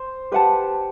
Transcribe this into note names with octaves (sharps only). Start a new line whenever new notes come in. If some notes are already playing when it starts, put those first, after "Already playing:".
Already playing: C5
G4 B4 F#5 A5